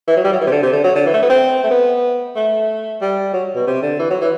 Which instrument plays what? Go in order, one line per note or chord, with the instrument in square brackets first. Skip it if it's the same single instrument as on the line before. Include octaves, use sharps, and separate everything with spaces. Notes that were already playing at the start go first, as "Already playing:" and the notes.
[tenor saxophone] E3
F#3
G3
F#3
E3
C3
D3
C3
D3
F#3
D3
E3
A3
B3
C4
A3
B3
A3
G3
F#3
B2
C3
D3
E3
F#3
E3